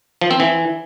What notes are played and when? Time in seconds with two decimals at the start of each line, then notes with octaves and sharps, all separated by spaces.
0.21 F3
0.31 C4
0.40 E3